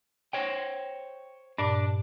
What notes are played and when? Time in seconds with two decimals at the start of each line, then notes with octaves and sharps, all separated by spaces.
0.33 C5 C#5 G5
1.58 G2 A#2 D4 D5